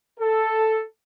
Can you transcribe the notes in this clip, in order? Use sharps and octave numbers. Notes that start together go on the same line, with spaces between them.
A4